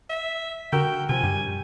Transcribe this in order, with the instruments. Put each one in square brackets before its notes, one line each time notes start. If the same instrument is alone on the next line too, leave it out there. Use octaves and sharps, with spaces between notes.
[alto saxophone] E5
[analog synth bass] D3 [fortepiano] F#4 A#4 E6 [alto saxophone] G5
[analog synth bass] C3 [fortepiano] F3 [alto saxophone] G#5
[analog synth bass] G2 [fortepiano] G3